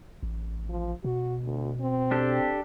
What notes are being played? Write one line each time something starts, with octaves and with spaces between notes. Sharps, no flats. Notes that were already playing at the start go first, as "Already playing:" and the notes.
A1
F3
B2 F#4
D2
C4
D4 G4 A4